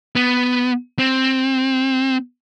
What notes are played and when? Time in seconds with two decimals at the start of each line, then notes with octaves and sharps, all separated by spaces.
0.16 B3
0.99 C4